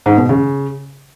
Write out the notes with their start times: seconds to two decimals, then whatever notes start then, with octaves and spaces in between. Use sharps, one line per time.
0.06 G#2
0.17 B2
0.29 C#3